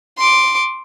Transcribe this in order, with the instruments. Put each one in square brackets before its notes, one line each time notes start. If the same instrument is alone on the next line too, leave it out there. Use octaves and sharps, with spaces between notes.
[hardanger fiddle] C6 D6